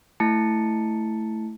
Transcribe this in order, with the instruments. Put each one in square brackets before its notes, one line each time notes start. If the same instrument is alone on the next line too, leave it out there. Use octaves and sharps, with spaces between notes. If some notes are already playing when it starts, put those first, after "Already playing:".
[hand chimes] A3 E4 A5 A6 C#7